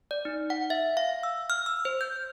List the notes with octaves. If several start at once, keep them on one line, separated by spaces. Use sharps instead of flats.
D5
D#4
F#5
E5
F5
E6
F6
E6
C5
G6